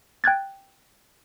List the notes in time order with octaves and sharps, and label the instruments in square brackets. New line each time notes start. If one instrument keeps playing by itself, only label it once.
[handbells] G5 F#6 G#6 A6